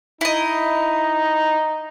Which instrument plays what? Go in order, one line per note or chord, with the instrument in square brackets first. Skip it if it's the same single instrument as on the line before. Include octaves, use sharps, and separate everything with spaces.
[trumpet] D#4 [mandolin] E4 D#5